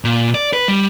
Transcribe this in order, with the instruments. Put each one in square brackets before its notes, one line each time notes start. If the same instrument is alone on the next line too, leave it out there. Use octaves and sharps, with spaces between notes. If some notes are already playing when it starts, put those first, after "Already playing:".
[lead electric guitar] A#2
D5
B4
G3